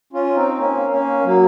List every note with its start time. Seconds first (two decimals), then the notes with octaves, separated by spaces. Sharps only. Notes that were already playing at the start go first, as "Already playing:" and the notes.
0.13 C#4 F4
0.35 C4 D#4
0.57 A#3 C#4
0.90 A#3 C#4
1.23 F#3 A#3